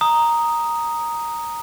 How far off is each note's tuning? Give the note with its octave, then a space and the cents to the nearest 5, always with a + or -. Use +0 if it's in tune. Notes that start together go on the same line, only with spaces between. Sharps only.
A#5 +0 D#6 +0